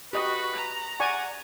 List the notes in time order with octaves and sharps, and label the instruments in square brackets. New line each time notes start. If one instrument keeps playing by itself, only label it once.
[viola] F#4 [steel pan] G4 D#5 [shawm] B4
[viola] A#5
[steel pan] D5 G#5 C#6 [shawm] F#5